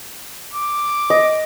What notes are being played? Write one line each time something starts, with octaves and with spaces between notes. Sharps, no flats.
D6
D#5